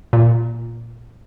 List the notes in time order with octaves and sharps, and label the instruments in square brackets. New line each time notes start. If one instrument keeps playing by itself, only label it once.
[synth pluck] A#2